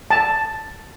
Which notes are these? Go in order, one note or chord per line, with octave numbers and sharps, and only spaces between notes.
A5